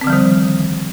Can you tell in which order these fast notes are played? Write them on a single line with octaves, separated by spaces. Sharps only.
C4 D3 F3 G3 D#3